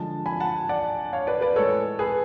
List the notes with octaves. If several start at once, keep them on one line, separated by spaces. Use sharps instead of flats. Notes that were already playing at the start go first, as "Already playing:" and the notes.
Already playing: D3 F3 G#3 A5
G#5 B5
F#5 A5
D5 F#5
C#5 F5
B4 D5
B4 D5
A2 G#3 A4 C#5
G#4 B4